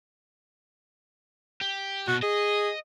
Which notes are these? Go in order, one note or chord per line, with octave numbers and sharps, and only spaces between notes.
G4
B2 F#4
G#4 D#5